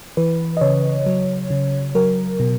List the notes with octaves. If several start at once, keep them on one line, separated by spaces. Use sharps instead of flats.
E3 B4
D#5
C#3 C#5
F#3
C#3
F#3 A#4
B2